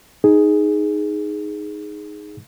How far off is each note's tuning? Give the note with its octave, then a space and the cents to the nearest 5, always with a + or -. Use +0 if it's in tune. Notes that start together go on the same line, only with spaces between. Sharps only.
D#4 +0 G#4 +0